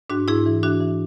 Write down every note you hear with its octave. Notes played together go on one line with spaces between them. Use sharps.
G#2 D4 F#4
G#2 E4 G#4
E3
E3 D4 F#4
E3